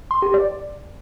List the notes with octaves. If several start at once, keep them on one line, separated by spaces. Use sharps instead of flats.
C6
G4
D5